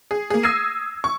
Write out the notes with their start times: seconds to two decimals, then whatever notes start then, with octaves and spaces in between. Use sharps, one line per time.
0.11 G#4
0.30 A#3 G#4
0.43 D#6 E6 G#6 A#6 C7 D#7
1.04 C#6